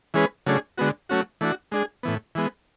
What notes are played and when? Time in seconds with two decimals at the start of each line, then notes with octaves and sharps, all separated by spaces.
0.14 E3 G#3 C#4 G#4 B4
0.46 C#3 F#3 A3 D4 G#4
0.78 D3 G#3 B3 F#4
1.09 F#3 A3 C#4 F#4
1.41 E3 A3 D4 F#4
1.72 G#3 D4 G#4
2.03 A2 E3 B3
2.35 E3 G#3 B3